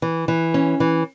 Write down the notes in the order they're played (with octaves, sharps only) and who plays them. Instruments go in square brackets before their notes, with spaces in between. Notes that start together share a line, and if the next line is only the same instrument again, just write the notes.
[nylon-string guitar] E3
E3
C#4
E3